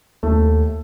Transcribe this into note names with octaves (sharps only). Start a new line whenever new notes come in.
D#2 A3